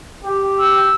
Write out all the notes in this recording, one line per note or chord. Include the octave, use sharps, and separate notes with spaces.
G4
E6